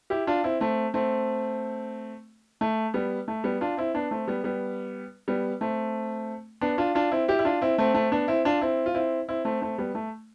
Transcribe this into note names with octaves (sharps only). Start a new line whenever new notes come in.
E4 G4
D4 F4
C4 E4
A3 C4
A3 C4
A3
G3 B3
A3
G3 B3
D4 F4
C4 E4
B3 D4
A3 C4
G3 B3
G3 B3
G3 B3
A3 C4
B3 D4
D4 F4
D4 F4
C4 E4
E4 G4
E4
D4 F4
C4 E4
A3 C4
A3 C4
B3 D4
C4 E4
D4 F4
C4 E4
F4
C4 E4
C4 E4
A3 C4
A3 C4
G3 B3
A3